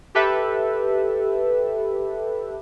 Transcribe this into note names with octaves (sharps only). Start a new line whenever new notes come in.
G4 A4 B4 E5